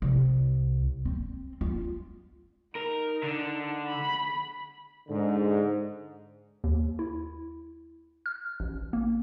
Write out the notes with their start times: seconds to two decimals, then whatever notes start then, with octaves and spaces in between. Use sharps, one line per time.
0.02 C2
1.05 C4
1.61 F4
2.75 D#4 A#4
3.23 D3
3.86 B5
5.09 G#2 D3
6.64 D#2
6.99 E4
8.26 F6
8.60 A1
8.93 A#3